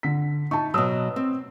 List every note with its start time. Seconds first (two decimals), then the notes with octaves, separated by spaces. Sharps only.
0.03 D3 B6
0.51 D#4 A5 C#6
0.74 B2 F#3 C#5 D#6 E6
1.16 C4